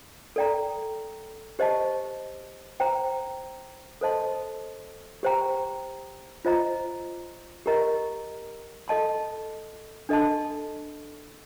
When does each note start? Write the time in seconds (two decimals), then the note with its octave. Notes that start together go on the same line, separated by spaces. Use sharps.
0.36 A4 D5 G5 A#5
1.59 G4 C5 D#5 A5
2.80 C5 G5 A#5
4.01 A4 C5 D#5 A5 C6
5.23 G4 C5 G5 A#5
6.45 F4 C5 D#5 A#5
7.66 G4 A#4 D#5 A#5
8.88 A4 D#5 A5 C6
10.09 D4 A4 D#5 A5 C6